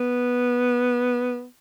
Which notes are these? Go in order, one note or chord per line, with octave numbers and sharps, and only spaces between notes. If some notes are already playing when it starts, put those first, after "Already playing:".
Already playing: B3